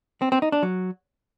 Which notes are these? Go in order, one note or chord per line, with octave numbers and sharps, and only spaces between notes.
C4
C4
D#4
D4
F#3